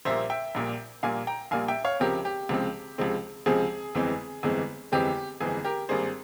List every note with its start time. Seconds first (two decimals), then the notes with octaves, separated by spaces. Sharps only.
0.05 A#1 A#2 G3 A#3 C5 E5
0.30 E5 G5
0.55 A#1 A#2 G3 A#3
1.03 A#1 A#2 G3 A#3 F5 G#5
1.27 G5 A#5
1.51 A#1 A#2 G3 A#3 F5 G#5
1.68 E5 G5
1.85 C#5 F5
2.00 C#2 C3 F3 G#3 C4 G4 A#4
2.25 G4
2.49 C#2 C3 F3 G#3 C4
2.98 C#2 C3 F3 G#3 C4
3.46 C#2 C3 F3 G#3 C4 G#4
3.95 G1 F2 E3 G#3 C4
4.43 G1 F2 E3 G#3 C4
4.92 G1 F2 E3 G#3 C4 G4
5.40 G1 F2 E3 G#3 C4 G#4
5.65 G4 A#4
5.89 G#1 G2 G3 A#3 G#4 C5